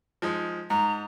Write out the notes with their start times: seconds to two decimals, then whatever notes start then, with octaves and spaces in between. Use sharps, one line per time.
0.22 F3 G#3 D#4
0.70 G#2 A#5